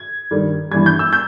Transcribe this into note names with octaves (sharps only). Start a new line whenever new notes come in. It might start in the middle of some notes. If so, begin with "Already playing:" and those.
Already playing: G#6
G2 D#3 G3
G2 E3 G3 G#6
G6
E6
G6